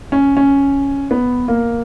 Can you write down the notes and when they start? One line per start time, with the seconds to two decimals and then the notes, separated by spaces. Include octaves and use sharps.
0.12 C#4
0.37 C#4
1.11 B3
1.48 A#3